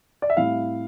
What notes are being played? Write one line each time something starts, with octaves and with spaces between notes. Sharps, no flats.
D5
E5
A2 G3 C4 E4 F5